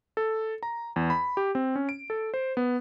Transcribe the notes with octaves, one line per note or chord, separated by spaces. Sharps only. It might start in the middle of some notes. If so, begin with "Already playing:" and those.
A4
A#5
E2
B5
G4
C4
C#4
D7
A4
C5
B3